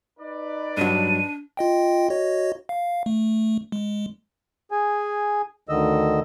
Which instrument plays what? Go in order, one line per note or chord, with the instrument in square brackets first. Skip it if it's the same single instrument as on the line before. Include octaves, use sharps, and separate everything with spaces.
[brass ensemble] D#4 B4 D5
[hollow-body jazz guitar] G2 F#3 [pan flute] D4 [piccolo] D#7
[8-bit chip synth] F4 D#5 G5
F#4 C#5 D#5
F5
A3
G#3
[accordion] G#4 G#5
D2 D3 D#3 D#5 E6